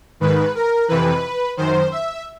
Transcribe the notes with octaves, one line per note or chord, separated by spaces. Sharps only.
G#2 D#3 B4
A#4
F2 C3 E3 B4
F#2 D#3 C5
E5